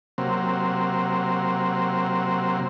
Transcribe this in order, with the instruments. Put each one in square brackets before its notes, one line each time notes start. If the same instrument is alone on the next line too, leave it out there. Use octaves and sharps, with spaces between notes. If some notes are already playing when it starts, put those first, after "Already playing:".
[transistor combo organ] C3 F#3 A#3 C4